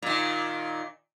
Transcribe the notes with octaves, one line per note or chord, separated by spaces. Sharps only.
A#2 D#3